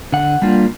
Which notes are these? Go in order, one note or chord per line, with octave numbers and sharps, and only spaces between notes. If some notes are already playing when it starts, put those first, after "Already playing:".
D3 F#5
G3 A#3 D4 F4